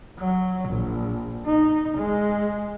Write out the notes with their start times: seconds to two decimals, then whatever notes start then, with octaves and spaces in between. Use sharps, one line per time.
0.18 F#3
0.69 A#1
1.46 D#4
1.97 G#3